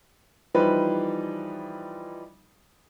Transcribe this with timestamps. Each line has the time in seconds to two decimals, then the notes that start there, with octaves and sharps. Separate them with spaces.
0.54 E3 F3 G3 D#4 B4 C5